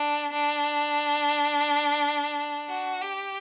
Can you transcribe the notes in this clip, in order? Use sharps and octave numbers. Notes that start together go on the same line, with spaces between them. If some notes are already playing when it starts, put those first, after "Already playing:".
Already playing: D4
D4
F#4
G4